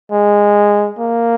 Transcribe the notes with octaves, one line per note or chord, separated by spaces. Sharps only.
G#3
A#3